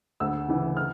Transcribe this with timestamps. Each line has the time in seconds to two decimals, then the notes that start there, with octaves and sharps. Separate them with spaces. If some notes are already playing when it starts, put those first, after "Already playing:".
0.20 D2 E6
0.48 C#3 E3
0.77 F6